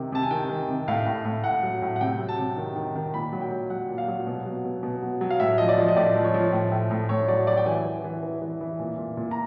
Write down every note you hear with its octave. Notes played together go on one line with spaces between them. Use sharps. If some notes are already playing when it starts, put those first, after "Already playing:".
Already playing: C3 D#3
C3 A5
G#5
D#3 G5
D#3
C3
A2 F5
A2
A2
A2 F#5
F#3
A2
F#5
C3 G5
F#3
A5
C3
D#3
D#3
D#3
A#2 B5
F#3
G5
F#3
F#3 F#5
A#2
F5
F#3
B2
F#3
B2
B2
F#3
F#3
F5
A2 E5
F3 D#5
D5
F3
D#5
A2 D5
F3
C#5
F3
A2
A2
A2
A2 C#5
F#3 D5
F#3 D5
G5
E3 G#5
E3
E3
E3
E3
E3
A#2
A#2
A#2
A#5